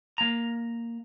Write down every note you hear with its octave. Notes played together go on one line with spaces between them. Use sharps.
A#3 A#5